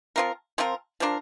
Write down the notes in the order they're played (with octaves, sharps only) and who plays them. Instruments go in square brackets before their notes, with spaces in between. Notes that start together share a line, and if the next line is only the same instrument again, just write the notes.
[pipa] F3 C4 F4 A#4
F3 C4 F4 A#4
F3 D4 F4 A#4